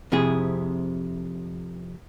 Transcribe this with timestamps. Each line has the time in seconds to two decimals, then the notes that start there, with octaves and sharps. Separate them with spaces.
0.12 F2 C3 E4 G#4